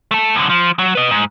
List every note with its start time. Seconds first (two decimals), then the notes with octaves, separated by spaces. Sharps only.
0.11 A3 A4
0.35 F#2 D3
0.50 F3
0.79 F#3
0.95 B4 D#5
1.11 G#2